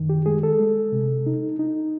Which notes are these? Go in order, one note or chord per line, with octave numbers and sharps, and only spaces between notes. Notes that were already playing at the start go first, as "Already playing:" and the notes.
Already playing: F#2 D#3
G4
G#3 G#4
A4
G#3
C3
D#4
D#4